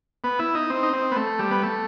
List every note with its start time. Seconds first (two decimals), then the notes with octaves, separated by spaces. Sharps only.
0.24 B3
0.39 E4
0.55 D#4
0.70 C4
0.83 D#4
0.93 C4
1.12 B3
1.16 A3
1.39 G3
1.51 B3
1.63 A3